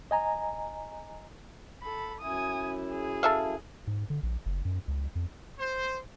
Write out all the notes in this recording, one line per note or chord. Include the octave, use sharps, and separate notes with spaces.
D#5 G#5 A#5
A4 B5
F#2 E4 G#5 D#6
G#4
A4 E5 F5
G#2
D3
A#1
F#1
F#2
C#2
F2
C5